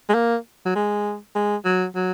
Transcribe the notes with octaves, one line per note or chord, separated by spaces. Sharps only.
G#3
A#3
F#3
G#3
G#3
F#3
F#3